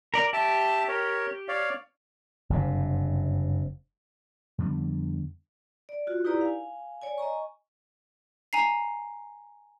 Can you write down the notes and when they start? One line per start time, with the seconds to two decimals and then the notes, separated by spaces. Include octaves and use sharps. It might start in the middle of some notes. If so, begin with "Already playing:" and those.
0.14 A#4 D5
0.33 G4 E5 A5
0.88 A#4 C#5
1.48 C#5 D5 F5
2.50 F#1 G2 C3
4.58 F2 D3 G3 B3
5.89 D5
6.07 F4 F#4
6.25 D#4 E4 G4 B4 D5 A#5
6.41 F5 G#5
7.02 C#5 D5 G#5
7.18 D#5 G#5 A#5 C#6
8.53 G#5 A#5 C7